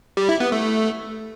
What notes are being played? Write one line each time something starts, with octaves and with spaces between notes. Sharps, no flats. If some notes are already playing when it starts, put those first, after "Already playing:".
G3
E4
B3
A3